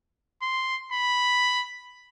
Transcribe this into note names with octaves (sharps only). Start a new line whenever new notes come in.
C6
B5